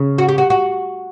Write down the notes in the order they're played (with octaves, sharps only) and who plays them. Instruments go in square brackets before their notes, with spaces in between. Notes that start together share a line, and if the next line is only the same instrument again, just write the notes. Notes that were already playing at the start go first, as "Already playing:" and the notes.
Already playing: [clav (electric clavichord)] C#3
[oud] F#4
G4
F#4
F#4